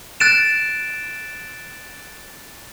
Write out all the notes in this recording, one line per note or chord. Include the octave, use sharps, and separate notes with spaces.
F#6 A6 D7 E7